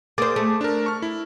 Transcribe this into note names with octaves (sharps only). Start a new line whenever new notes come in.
A#3 G#4 C5 D6 A6
A3
D4 A#4
C#6 F6
E4